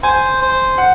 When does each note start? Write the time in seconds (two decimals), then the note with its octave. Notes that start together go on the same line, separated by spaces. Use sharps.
0.03 C5 G#5
0.41 C5
0.78 F#5